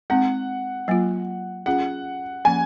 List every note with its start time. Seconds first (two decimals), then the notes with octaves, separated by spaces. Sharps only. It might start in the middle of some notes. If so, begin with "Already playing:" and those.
0.10 G#3 C4 D#4 F#5
0.88 F#3 A#3 F4
1.66 C#4 F4 G#4 F#5
2.45 F3 A#3 C#4 G#5